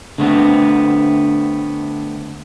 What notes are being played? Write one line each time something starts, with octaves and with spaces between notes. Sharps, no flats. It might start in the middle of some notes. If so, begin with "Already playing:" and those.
D3 A3 B3 C4